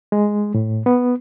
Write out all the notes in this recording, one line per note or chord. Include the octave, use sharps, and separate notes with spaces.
G#3
A2
B3